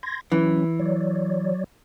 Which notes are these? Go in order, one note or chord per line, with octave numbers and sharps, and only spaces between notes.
C6 G#6 A#6
E3 F#3 C#4
F#3 C#5 D5